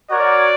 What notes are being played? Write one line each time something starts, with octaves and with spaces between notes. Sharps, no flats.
F#4 A#4 C#5 D5